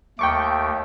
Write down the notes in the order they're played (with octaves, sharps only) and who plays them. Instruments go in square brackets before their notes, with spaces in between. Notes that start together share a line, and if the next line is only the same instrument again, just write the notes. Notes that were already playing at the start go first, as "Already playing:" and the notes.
[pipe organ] D#2 A3 [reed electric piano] G5 C#6 D6